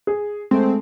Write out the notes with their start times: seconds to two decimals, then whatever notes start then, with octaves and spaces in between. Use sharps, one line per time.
0.07 G#4
0.51 G#3 A3 C4